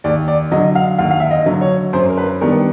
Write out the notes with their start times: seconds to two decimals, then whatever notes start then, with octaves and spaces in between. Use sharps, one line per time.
0.04 D#2 D5
0.28 D5
0.51 D3 F#3 D#5
0.75 F5
0.98 D#2 F5
1.11 F5
1.20 E5
1.31 D#5
1.46 D3 F#3
1.61 C#5
1.93 F#2 C5
2.09 A#4
2.17 B4
2.41 D#3 G3 B3 D4 A#4